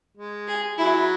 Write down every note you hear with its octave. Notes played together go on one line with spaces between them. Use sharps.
G#3
G#4
F#3 E4